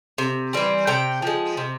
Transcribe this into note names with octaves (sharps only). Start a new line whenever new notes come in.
C3
E3 G3 C4
C3 G5
F3 G#3
C3